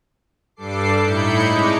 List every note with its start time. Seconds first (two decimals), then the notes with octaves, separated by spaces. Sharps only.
0.56 G2 G3 D4 A4 D6 C7
1.00 A2 D#4 E4 B5 G6 C#7
1.46 C3 G#3 D4 D#4 C#6 D6